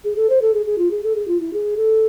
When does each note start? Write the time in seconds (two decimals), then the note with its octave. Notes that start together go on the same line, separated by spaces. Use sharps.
0.04 G#4
0.16 A4
0.29 C5
0.42 A4
0.54 G#4
0.66 G#4
0.78 F4
0.91 G#4
1.04 A4
1.15 G#4
1.28 F4
1.40 E4
1.53 G#4
1.77 A4